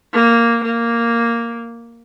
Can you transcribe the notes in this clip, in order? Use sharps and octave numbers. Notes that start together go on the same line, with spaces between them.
A#3
A#3